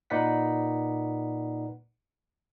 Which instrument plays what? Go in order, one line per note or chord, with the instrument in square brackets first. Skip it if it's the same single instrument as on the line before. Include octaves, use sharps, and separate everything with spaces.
[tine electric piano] A#2 D#4 B4 D5 F#5 B6